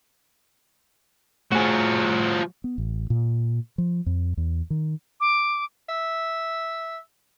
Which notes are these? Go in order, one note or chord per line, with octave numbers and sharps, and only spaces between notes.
A2 F3 F#4 G#4
B3
A1
A#2
F3
F2
E2
D#3
D6
E5